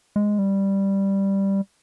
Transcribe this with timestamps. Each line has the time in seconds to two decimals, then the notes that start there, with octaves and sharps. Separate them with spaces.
0.16 G#3
0.38 G3